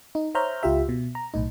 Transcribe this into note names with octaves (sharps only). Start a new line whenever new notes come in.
D#4
C5 C#5 E5 A#5 F6 G6
C#2 F4 G4 E5
B2
A#5
B1 A2 D#4